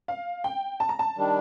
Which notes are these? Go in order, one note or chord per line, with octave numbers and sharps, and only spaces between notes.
F5
G5
A5
A#5
A5
D#3 G3 D4